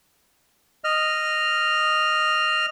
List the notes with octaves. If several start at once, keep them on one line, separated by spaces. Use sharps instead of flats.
D#5 F6